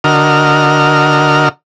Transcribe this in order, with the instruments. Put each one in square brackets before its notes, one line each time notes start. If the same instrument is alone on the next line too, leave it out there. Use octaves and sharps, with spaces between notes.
[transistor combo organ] D3 F#4 A#4 D#5 F6